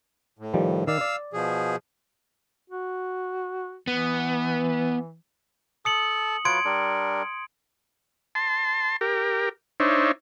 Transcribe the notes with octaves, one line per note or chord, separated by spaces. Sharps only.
A2
D#3 F3 G3
D#3 D5 F5 E6
D5
B2 F3 G#4
F#4
E3 B3
A4 A5 D#6 C#7 F#7
F#3 F4 B4 C6 G#6 D7
G3 D4 A#4
A5 C6
G4 A#4
D4 D#4 C5 C#5 E5